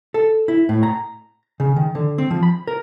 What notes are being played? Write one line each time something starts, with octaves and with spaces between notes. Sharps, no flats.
A4
E4
A2
A#5
C#3
D#3
D3
C4
F3
B5
A#4